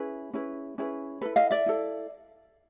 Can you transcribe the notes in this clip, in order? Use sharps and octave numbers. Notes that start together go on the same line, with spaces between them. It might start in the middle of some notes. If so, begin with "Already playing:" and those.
Already playing: C#4 E4 G#4 B4
C#4 E4 G#4 B4
C#4 E4 G#4 B4
E4 A4 B4
D#5 F5
D5 E5
E4 A4